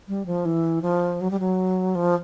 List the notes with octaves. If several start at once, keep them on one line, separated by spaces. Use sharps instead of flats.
G3
F3
E3
F3
F#3
G3
F#3
F3